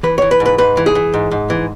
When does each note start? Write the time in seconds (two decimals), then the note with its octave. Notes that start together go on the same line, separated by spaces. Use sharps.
0.03 E3 B4
0.18 E3 C#5
0.31 B4
0.40 G#2
0.46 B4
0.58 G#2 B4
0.77 E3
0.86 G#4
0.95 E3
1.14 G#2
1.31 G#2
1.50 E3